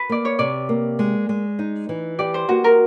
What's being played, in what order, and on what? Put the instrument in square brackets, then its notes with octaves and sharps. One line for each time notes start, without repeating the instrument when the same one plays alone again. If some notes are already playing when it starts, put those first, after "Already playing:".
Already playing: [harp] B4
[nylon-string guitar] A#3 [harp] D5
[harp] C#5
[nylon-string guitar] C3 [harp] D5
[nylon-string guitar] A#3
G#3
G#3
D#4
E3
[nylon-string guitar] G4 [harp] D5
[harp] C5
[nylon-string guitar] A#3 [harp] F#4
[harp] A#4